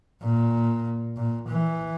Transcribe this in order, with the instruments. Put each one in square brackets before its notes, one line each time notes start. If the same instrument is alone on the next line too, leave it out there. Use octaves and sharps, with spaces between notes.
[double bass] A#2
A#2
E3